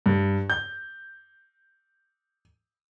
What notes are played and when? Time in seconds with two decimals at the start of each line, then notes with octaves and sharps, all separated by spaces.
0.06 G2
0.50 G6